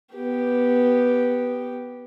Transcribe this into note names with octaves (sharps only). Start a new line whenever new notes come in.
B3 G4